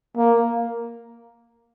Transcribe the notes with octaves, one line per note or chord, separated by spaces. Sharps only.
A#3